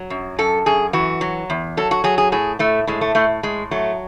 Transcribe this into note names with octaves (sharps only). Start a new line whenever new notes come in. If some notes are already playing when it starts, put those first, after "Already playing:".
Already playing: F#3
F#2
F#2 A4
F#2 G#4
E3 F#4
F#3
E2
F#3 A4
F#4
F#3 G#4
G#4
A2 G#4
A2 A3
A2 G#3
A3
A2 A3
A2 G#3
F#3 A3